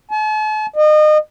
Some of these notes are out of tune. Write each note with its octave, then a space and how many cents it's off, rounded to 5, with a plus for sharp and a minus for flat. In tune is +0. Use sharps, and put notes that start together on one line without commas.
A5 -45
D#5 -30